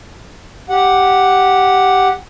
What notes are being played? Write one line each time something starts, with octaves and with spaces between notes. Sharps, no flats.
G4 F#5